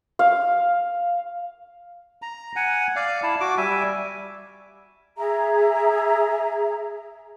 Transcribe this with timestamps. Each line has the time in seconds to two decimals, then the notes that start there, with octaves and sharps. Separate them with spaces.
0.19 F5
2.22 A#5
2.56 F#5 G#5
2.96 D5 F5
3.23 E4 A5
3.40 F#4 D6
3.58 G3 E5 G#5
5.17 G#4 E5 A#5